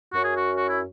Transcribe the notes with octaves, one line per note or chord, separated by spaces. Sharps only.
F#2 F#3 C#4 F#4
G#4
F#4
F#4
E4